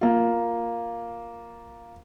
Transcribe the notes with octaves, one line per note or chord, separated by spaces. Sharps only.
A#3 F4